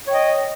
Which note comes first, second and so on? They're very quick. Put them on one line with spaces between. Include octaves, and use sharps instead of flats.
C#5 G5 D#5